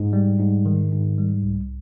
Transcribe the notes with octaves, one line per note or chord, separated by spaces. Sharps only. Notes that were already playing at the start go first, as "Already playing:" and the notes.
Already playing: G#2
G3
G#2
D#3
G#2
G3
C2